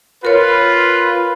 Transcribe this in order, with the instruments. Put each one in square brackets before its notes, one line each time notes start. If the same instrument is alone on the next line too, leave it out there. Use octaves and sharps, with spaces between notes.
[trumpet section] F4 B4 [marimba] A#4 C#5